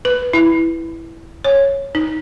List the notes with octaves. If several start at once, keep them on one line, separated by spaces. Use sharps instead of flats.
B4
E4
C#5
D#4